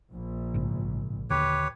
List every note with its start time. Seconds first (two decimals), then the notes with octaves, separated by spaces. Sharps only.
0.13 A#1
0.54 A1 G#2 C#3
1.30 D#2 D3 G4 B4 C#5